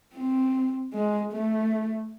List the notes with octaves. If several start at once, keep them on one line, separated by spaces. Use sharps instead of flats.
C4
G#3
A3